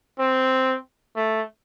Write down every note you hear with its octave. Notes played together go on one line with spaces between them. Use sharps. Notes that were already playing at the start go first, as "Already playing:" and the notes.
C4
A3